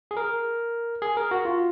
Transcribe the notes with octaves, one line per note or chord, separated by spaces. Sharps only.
G#4
A#4
G#4
A#4
F#4
F4